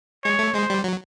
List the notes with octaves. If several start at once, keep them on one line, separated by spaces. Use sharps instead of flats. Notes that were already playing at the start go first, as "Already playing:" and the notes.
G#3 C#5
A3
G#3 C5
G3
F#3